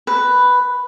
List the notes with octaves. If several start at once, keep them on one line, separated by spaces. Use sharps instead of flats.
B4